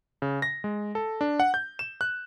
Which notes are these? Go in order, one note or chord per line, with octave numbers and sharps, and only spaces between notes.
C#3
A#6
G#3
A4
D4
F#5
G6
E7
F#6